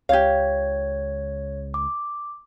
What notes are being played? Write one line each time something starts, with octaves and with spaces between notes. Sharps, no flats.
C#2 G4 C#5 F5 G#6
D6